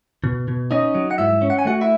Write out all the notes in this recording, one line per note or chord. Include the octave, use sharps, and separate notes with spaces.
B2
B2
C#4 D#4 D#5
F#3
F#5
G#2 E4 E5
C#4
F#5
G#5
A3 F#4 F#5
E4 E5